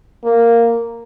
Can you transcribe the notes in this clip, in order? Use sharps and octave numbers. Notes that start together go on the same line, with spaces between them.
A#3